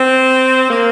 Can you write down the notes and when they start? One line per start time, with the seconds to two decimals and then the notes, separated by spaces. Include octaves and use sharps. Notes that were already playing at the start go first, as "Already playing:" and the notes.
Already playing: C4
0.70 A#3